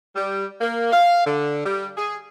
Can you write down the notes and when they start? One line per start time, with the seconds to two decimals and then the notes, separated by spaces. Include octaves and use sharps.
0.16 G3
0.61 A#3
0.93 F5
1.26 D3
1.65 G3
1.97 G#4